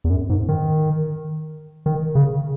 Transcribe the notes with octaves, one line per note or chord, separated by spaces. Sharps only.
E2
F#2
G#2
D#3
D#3
C#3